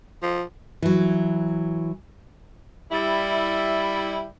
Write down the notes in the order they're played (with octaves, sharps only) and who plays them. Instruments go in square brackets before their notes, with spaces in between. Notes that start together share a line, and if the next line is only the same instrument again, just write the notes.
[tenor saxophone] F3
[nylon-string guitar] E3 F#3
[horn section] G3 E4